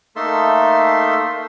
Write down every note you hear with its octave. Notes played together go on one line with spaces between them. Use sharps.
A3 A#3 D#4 A4 E5 C6